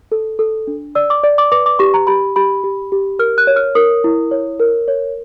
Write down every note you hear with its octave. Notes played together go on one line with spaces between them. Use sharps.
A4
A4
D4
D5 E6
D6
D5
D6
B4 D6
D6
G4 C#6
A#5
G4 B5
G4 B5
G4
G4
A#4 F6
F#6
C#5
F6
A#4 D#6
E4
C#5
A#4
C#5